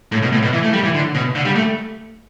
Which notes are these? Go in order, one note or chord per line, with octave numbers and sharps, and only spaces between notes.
A2
B2
A2
B2
E3
A3
G3
E3
D3
B2
D3
G3
A3